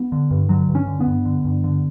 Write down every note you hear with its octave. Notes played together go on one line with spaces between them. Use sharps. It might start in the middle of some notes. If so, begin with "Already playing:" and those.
Already playing: B3
D3
G2
D3 F#3
G2
C#4
D3
B3
G2
D3
G2
D3